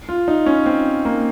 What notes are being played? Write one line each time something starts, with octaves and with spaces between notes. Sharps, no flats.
F4
D#4
C#4
C4
A#3